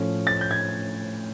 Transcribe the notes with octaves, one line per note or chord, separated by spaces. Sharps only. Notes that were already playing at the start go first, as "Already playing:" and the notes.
Already playing: A2 F3 A3 C#4
A6
G6
G#6